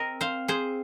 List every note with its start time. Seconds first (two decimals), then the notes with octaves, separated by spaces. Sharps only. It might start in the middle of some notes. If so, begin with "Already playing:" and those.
Already playing: C4 A#4 D#5
0.21 C5 F5
0.48 G#4 C5